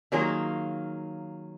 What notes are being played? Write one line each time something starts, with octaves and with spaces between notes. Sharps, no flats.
D#3 F#3 A#3 F4 G#4